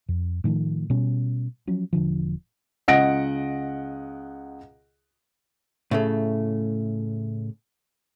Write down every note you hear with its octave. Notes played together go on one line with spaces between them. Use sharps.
F2
A2 D#3 F3 A3
B2 G3 C#4
F3 F#3 C#4
E1 D3 F3
C#2 D#5 F#5 A#6 D7
A2 C#3 A3